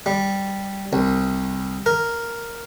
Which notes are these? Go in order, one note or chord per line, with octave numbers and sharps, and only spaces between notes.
G3
C2
A#4